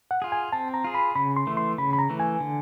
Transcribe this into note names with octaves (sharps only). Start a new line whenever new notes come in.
F#5
F4 G#4
G#5
C4 A5
A#5
F4 G#4
B5
C#3 B5
C6
E3 A3
C6
C#3 B5
B5
A#5
E3 A3
G#5
D3